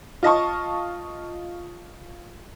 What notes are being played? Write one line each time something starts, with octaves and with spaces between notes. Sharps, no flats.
F4 D#5 A5 C#6